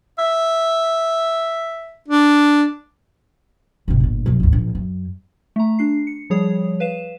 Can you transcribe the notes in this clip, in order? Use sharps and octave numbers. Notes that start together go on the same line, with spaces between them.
E5
D4
G#1 C3
G1 A#2
B1 F#2
G#1 D#2
A#1
F#2
A3 A#5
D4 C7
C#7
F3 G3 G#4 C#5 D#6
B4 F5 E7